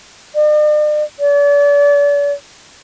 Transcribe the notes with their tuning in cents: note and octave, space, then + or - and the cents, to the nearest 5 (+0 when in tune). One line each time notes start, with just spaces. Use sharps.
D5 +45
D5 -40